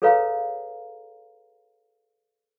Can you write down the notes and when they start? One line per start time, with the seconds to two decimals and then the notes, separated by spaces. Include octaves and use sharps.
0.02 G#4 A4 B4 C#5 F5 A#5